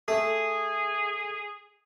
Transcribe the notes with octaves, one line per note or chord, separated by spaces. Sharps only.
A3 G#4